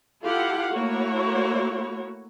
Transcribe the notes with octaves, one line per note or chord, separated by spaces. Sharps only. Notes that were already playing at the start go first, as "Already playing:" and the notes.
E4 F4 G4 A4 F5 F#5
A3 A#3 E4 F#4 C#5